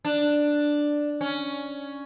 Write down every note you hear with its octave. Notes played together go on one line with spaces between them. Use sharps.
D4
C#4